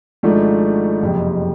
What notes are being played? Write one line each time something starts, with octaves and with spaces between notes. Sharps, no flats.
G#1 G#2 F3 A3 D4
F#1 F2 C3